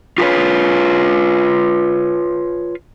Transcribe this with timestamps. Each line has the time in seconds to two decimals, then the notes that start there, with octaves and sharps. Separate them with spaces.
0.18 F4 G4 A#4 B4 C#5